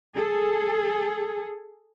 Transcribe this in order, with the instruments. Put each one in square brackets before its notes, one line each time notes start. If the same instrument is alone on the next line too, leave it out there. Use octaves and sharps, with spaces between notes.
[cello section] G#4 A4